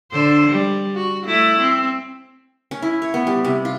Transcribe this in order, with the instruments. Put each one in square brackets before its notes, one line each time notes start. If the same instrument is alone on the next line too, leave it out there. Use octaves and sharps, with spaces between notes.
[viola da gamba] D3 C5
G3
F#4
A3 E4
C4
[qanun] C#4
E4
C#5
B3
G3
C3
F4